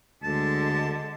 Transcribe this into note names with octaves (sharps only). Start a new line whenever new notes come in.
D2 D3 G#3 A5